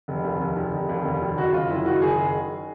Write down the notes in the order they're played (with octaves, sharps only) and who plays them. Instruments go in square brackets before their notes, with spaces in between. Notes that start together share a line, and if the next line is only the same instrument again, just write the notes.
[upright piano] F1
D#2
F1
D#3
F1
D#2
F1
D#3
F#1 F#4
F#2 F4
F#1 E4
D#3 F#4
F#1 G#4